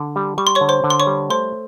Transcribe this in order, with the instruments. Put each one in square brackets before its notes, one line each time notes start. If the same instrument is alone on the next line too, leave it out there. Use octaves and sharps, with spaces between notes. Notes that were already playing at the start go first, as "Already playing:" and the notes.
Already playing: [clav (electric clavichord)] D3
G3
[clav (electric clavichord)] G3 [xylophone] C#6
[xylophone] C6
C#5 C#6
[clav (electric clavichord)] D3
[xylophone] C5 C6
[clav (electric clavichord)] D3
[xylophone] C6
C#5 C#6
[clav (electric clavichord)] G3
[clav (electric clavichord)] A3 [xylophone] C5 C6